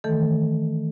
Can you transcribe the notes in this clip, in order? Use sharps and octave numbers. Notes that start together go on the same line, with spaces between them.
D#3 E3 A3 A4